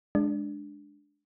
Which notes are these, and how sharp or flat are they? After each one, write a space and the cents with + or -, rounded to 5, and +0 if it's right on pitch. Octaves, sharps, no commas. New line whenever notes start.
G#3 +0 D4 +0